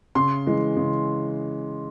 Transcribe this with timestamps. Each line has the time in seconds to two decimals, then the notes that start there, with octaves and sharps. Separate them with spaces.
0.15 C#3 C6
0.47 E3 G#3
0.77 C#3